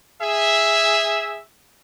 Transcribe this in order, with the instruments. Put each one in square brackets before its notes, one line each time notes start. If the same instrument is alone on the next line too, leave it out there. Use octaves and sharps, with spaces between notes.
[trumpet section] G#4 E5